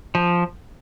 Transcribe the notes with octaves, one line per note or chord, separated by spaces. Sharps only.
F3